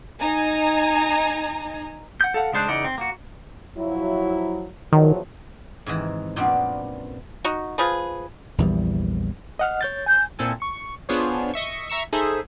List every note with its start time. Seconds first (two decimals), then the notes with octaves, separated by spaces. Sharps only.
0.19 D#4 G#5 A#5
2.21 F#5 G6
2.34 A4 F5 F#5
2.53 C#3 G#3 D4 C5 F#6
2.68 C#3 E3 D#4 D5 F#5
2.84 C4
2.98 A#3 F#4
3.77 F3 F#3 E4
4.93 E2 D#3 F3 F#3
5.86 G#2 C3 D#3 E3
6.36 F#2 A#2 F3 B3 C4 D4
7.44 D#4 F#4
7.78 F3 G#4 B4
8.58 A#1 E2 E3 G3
9.59 D#5 F#5 F6
9.81 C#5 G6 A6
10.06 G#5 G6
10.38 A#2 C4 E4 A4 G#5 C#7
10.60 C#6 C#7
11.09 B3 D4 F4 G#4 C5 C#5
11.54 D#5 E5 C#6
11.90 E5 A#5 C#6 E6
12.13 D#4 G#4 A4 C5 E5